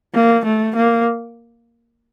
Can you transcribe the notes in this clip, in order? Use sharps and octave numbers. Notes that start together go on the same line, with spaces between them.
A#3
A3
A#3